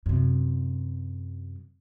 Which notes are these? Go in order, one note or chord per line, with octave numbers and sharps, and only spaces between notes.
F#2 C3